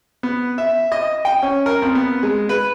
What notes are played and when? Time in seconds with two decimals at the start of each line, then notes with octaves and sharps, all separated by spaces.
0.23 B3
0.58 E5
0.92 D#5
1.25 G5
1.43 C#4
1.66 A#4
1.82 F2
1.95 B3
2.23 G#3
2.49 B4